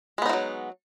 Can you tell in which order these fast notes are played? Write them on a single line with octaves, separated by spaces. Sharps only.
G#3 B3 D#4 F3 F#3